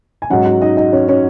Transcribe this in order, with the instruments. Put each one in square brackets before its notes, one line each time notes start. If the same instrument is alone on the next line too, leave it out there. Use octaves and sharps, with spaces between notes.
[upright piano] G#5
G#2 F#3 C#4 F#4 F#5
F#4 F#5
D#4 D#5
D#4 D#5
C#4 C#5
C#4 C#5